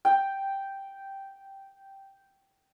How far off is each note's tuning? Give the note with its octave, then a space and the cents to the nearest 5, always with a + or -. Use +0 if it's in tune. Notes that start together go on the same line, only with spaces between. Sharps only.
G5 -5